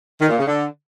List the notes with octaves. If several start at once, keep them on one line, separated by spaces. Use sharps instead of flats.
D#3
A#2
C#3
D3